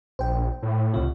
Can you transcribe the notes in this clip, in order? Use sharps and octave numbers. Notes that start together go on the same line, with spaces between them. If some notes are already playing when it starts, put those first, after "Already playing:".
A#1 C5 G5
A2
C#2 C3 F4